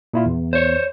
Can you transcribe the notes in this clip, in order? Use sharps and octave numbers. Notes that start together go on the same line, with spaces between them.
A#2 E4 F4
E2
C5 C#5